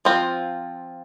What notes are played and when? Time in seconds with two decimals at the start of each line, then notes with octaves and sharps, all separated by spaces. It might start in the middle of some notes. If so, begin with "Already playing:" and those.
0.05 F3 C4 F4